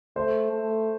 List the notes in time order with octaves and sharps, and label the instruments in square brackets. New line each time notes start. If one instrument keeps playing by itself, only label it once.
[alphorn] A3 [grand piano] C5
[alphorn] A3